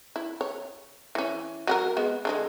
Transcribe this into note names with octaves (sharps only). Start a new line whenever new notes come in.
E4
C#5
E3 C#4
F#3 F#4 A#4
G#3 B3
D3 F3 G#3